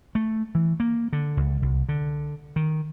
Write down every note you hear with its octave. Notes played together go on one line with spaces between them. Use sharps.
A3
E3
A#3
D3
C#2
C2
D3
D#3